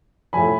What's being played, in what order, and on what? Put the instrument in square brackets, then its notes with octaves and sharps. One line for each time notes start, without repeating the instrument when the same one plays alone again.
[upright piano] A2 F3 G#5 B5